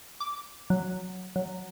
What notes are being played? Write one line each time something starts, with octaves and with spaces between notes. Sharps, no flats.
D6
F#3
F#3